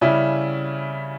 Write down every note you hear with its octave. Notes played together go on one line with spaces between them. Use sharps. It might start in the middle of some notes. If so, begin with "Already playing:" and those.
C#3 G3 C#4 E4